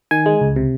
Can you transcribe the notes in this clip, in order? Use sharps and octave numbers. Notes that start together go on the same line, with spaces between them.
D#3 G#5
G#3
C#2
C3